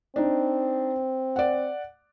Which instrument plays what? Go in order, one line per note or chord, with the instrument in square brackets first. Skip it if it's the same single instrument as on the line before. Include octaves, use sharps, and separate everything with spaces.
[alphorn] C4 [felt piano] D4 D#4
[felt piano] D5 F#5